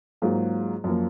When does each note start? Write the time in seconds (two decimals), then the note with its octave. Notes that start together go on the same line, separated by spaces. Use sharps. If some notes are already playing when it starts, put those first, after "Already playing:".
0.22 G#2 F#3 A#3 F4 G#4
0.84 F#2 F3 A#3